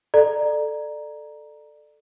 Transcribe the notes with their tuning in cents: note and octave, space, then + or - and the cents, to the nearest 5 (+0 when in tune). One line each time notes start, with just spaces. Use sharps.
A4 +0 D5 +25 A#5 +10